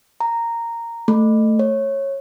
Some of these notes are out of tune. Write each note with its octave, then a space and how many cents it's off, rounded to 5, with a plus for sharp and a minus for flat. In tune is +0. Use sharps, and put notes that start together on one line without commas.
A#5 -10
A3 +5
C#5 -15